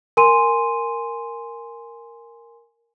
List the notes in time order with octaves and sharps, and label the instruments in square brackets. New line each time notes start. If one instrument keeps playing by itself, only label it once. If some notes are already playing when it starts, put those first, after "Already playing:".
[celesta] A#4 G#5 C6 D#7